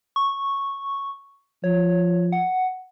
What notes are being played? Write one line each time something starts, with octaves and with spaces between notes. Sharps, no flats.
C#6
F3 C#5
F#5